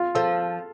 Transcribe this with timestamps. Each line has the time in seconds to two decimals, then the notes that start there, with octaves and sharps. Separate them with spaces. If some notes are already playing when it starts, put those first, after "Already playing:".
Already playing: F4
0.15 F3 A4